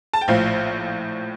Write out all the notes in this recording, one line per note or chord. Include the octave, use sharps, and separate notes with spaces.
A5
G5
A#1 A2 F3 F5